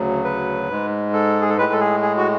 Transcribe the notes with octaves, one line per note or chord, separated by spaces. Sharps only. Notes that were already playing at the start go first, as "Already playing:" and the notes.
Already playing: D2 C#3 F#3
B4
G#2 G#3
A4
G#4
A4
A2 G#3 B4
A4
G#4
G#4
F#4